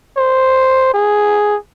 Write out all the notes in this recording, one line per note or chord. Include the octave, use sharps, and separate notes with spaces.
C5
G#4